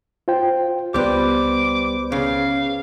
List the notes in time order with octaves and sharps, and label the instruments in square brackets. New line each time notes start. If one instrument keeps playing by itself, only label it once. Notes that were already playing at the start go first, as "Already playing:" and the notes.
[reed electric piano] F4 C5 G5
[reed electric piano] C#2 B3 [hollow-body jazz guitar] G3 G4 [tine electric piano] B4 C5 [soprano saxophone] D6
[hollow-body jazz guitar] C#3 [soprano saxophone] F5